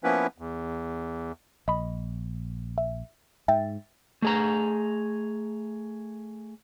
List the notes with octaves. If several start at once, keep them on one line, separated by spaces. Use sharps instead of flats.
F3 A#3 B3 C#4 E4 B4
E2
A#1 D#5 B5
E5
G#2 E5 G5 A6
A3 G#4 A#5